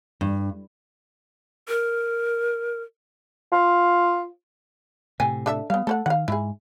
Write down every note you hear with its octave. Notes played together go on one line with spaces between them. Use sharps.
G2
A#4
F4
A2 C3 G5 G#5
D4 A4 E5
G3 B3 F5
A3 A4 C5 F#5
D#3 F5 F#5
G#2 E4 G#4